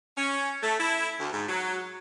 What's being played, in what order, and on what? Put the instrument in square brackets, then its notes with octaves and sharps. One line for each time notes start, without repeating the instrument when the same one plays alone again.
[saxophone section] C#4
A3
E4
D2
G#2
F#3